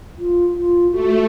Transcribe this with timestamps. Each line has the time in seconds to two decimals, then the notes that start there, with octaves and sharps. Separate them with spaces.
0.18 F4
0.57 F4
0.92 A3 F#4